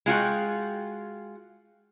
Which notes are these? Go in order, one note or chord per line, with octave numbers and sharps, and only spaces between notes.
G#3 F4 F#4 G5